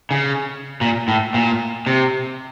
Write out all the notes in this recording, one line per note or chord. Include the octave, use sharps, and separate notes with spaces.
C#3
A#2
A2
A#2
C3